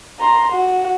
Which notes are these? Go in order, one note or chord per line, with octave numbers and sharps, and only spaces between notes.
A#5 C6
F#4